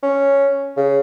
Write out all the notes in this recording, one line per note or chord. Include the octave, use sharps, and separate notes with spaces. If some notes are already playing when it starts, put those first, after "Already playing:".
C#4
C#3